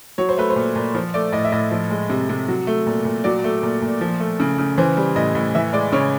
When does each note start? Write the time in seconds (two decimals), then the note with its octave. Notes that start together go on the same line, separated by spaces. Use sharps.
0.18 F#3 C#5
0.29 C5
0.38 A3 B4
0.50 C5
0.56 A#2
0.76 A#2
0.95 F3 C5
1.14 A3 D5
1.33 A2 D#5
1.45 E5
1.52 A2 D#5
1.71 F3
1.90 G#3
2.10 C3
2.29 C3
2.48 F#3
2.67 A3
2.87 A#2
3.05 A#2
3.24 F#3 D5
3.44 A3
3.63 A#2
3.82 A#2
4.01 F3
4.20 A3
4.40 C#3
4.58 C#3
4.78 E3 C5
4.97 G3
5.16 A2 D#5
5.35 A2
5.55 E3 E5
5.73 G#3 D5
5.92 C#3 C#5